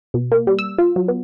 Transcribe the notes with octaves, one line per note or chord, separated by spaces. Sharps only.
B2
A#3
G3
E6
F4
F#3
B3